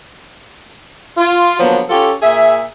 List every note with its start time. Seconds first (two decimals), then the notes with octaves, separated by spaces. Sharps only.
1.18 F4
1.60 D3 F3 F#3 A#3 B3
1.89 C#4 F4 G4 A4
2.22 A#2 G#4 E5